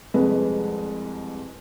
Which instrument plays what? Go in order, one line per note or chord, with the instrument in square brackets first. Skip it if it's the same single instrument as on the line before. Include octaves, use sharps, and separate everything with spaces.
[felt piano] C2 F2 G#3 B4